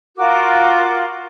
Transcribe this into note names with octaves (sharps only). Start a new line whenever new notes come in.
F4 F#4 A#4 D6